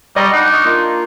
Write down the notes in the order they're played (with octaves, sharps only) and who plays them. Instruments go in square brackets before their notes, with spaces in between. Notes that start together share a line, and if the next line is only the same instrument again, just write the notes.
[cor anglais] G3 [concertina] G4 A#5 C#6 [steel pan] D5 [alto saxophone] D#5
[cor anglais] D4 [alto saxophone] D#4 [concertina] F#5
[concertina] D#5 C#6 F6
A#3 F4